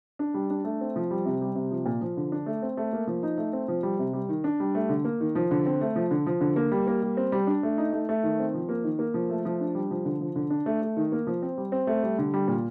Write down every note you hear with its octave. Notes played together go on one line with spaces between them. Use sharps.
D4
G3
D4
A3
C4
F3
G3
C3
G3
C3
F3
A#2
F3
D3
D4
A3
C4
A3
A#3
F3
D#4
A3
C4
F3
G3
C3
G3
D#3
D4
G3
A3
D3
A#3
D#3
F3
D3
C4
A3
F3
D3
F3
D3
A#3
G3
A#3
G3
C4
G3
D4
A3
D#4
A3
A3
D#3
C4
F3
A#3
D#3
A#3
F3
A3
F3
D4
G3
F3
D3
F3
D3
D4
A3
A3
D#3
A#3
F3
C4
G3
C4
A3
G3
D3
G3
A#2